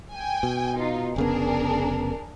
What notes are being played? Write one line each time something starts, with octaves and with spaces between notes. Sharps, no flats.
G5 G#5
B2
D#4 F4
F1 C#3 B3 D4 G#4 A#4